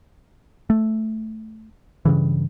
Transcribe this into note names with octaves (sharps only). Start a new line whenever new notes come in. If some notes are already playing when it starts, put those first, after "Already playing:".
A3
G2 C#3 E3